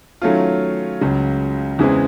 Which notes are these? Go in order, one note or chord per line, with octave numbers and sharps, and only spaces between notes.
D#3 F#3 A3 C#4 F4
C#2 C#3 F#3
E2 C#3 E3 G#3 C4